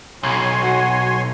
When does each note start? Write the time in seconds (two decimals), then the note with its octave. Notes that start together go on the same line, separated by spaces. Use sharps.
0.23 B1 C#5 G#5 C6
0.63 F#4